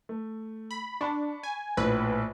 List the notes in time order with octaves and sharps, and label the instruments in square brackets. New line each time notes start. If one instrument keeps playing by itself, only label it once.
[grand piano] A3
[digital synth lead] B5
[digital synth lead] D4 [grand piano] A5 B5 C#6
[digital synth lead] G#5
[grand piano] A#1 A2 [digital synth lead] B4